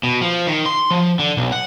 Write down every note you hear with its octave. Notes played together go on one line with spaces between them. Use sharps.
B2
F3
D#3
C6
F3
D3
B1
F#5